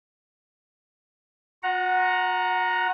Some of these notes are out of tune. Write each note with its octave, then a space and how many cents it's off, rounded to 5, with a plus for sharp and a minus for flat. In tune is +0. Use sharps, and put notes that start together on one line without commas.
F#4 -45 F#5 +0 A#5 +0